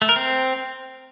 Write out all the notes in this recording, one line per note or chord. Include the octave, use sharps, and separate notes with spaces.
A3
A#4
C4